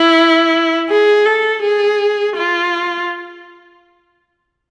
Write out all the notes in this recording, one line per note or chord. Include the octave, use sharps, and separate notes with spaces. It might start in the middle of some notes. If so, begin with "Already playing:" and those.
Already playing: E4
G#4
A4
G#4
F4